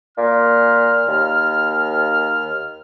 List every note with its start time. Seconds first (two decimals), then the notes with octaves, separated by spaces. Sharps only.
0.18 A#2 F6
1.08 D#2